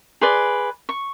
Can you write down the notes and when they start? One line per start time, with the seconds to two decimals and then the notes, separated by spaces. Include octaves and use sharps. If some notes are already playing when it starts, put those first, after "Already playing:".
0.21 G#4 B4 D5 C6
0.89 C#6